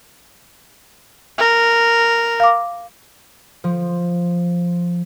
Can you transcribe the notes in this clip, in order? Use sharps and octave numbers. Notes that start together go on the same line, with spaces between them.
A#4
F5 D6
F3